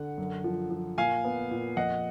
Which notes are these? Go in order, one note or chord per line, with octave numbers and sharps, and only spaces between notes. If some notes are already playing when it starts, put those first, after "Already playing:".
Already playing: D3 F#5
F#2
F3
F3
A#2 F5 G#5
B3
A#2
F2 D#5 F#5